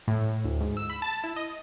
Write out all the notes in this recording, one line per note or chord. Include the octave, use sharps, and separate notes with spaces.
A2
D2
G#2
E6
B5
A5
E4
D#5